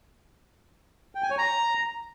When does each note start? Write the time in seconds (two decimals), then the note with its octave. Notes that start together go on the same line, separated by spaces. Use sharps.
1.15 G5
1.23 G#5
1.30 C#5
1.38 A#5